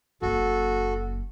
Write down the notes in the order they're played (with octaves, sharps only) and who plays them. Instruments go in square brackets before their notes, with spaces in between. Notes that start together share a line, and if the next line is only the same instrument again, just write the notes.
[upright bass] F#1 A#3 [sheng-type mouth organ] F#4 A4